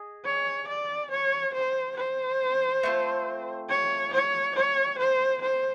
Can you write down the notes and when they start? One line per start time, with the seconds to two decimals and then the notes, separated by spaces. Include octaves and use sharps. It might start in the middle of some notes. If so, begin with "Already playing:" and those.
Already playing: G#4 D#5
0.25 C#5
0.68 D5
1.11 C#5
1.54 C5
1.97 C5
2.83 A3 C4 F4
3.69 C#5
4.13 C#5
4.56 C#5
4.99 C5
5.41 C5